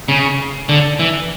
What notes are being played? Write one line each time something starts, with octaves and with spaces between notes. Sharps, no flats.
C#3
D3
E3